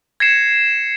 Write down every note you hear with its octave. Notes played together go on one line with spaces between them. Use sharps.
G#6 A#6 C7 C#7 E7